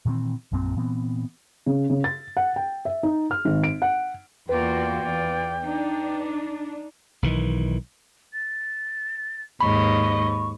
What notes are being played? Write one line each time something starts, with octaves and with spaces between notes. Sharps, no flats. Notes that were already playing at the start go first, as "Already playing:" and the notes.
A#2 D#3 E3 C4
A#1 F#2 A#2 C4
A#2 E3 B3 C4
C#3
C#3
A6
F#5
G5
E5
D#4
F6
G#1
D7
F#5
E2 A#3 F4 F#4 B4 D5 G5
E2 F4 D5
D4 D#4
B1 D#3 E3
A6
D#2 G#2 D#5 B5 C#6